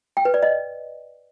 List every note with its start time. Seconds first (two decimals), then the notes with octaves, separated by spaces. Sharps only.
0.17 G5
0.25 B4
0.34 D5
0.43 D#5